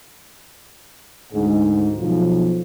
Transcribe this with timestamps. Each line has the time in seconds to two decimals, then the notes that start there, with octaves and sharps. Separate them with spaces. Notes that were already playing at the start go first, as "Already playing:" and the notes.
1.33 D2 G#2
1.97 B1 F3